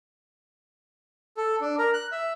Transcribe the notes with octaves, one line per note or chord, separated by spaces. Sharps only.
A4
D4
A#4
F#6
E5